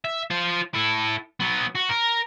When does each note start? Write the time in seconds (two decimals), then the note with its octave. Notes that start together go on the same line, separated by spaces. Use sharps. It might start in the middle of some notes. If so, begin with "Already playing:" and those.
0.05 E5
0.30 F4 C5
0.74 E4 A4
1.40 F#3 B3
1.75 F#4
1.89 A#4